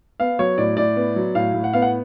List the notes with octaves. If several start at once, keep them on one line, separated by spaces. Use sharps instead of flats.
B3 F5
F#3 C#5
A2 D5
A2 D5
B3
F#3
A2 F5
A2
F#5
B3 F5
F#5